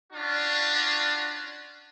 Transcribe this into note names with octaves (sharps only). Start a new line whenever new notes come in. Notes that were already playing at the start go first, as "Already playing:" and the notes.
C#4 D4 F4 F#4